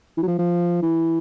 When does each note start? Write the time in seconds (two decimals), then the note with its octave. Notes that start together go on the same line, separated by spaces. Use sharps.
0.17 E3
0.22 F#3
0.27 F3
0.39 F3
0.83 E3